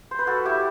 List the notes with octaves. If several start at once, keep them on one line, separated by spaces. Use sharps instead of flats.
C5
B4
F#4 A4
E4 G4